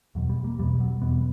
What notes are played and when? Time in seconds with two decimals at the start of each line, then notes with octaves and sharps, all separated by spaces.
0.15 E2 B2 F#3
0.29 G3
0.44 A#3
0.59 E2 B2 G3
0.80 F#3
1.02 E2 B2 B3